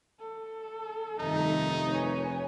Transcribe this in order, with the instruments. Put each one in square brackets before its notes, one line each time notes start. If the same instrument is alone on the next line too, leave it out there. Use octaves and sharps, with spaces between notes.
[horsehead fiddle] A4
[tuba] F1 [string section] G2 D#3 A3 [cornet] D#4
[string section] B4 [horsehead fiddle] C#5 G#5